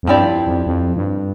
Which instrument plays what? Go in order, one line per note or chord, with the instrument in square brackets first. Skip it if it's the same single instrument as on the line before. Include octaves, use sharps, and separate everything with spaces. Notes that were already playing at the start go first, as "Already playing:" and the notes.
[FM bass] F2
[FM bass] G2 [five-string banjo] F3 C4 E4 G4 D5
[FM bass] F2
F2
G2